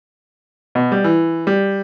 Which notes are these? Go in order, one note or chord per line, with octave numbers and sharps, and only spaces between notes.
B2
G3
E3
G3